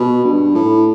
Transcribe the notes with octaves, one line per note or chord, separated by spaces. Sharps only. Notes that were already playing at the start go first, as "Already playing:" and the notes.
Already playing: B2
G2
A2